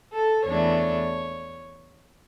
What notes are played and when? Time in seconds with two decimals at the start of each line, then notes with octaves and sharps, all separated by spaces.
0.12 A4
0.46 E2 E3 A3 D4 C#5